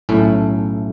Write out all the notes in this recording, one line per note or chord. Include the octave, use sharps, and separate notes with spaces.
B1 A2 C#4 E4 A4 E5